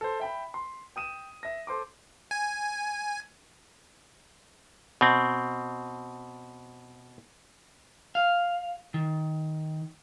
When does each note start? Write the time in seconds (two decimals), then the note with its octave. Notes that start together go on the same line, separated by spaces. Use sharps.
0.01 A4 C5
0.20 E5 G5 B5
0.54 C6
0.96 G5 D#6 D#7 E7
1.43 E5 A#6
1.67 A4 C5 C6 D6
2.31 G#5
5.01 B2 C4
8.15 F5
8.94 D#3